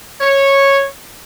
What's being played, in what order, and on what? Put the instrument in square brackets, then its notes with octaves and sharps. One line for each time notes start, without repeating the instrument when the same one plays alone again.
[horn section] C#5